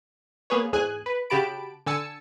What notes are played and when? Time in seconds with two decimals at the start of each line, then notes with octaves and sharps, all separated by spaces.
0.50 A#3 B3 G#4 B4 C#5
0.73 E2 G#2 G#4 G#5 F#6
1.06 B4
1.30 C#3 F#4 G4 A5 B5 D7
1.86 D3 G#5 A5 E6 C#7